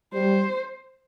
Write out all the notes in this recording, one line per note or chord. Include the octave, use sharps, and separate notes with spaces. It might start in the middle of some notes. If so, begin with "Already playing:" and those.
G3 C5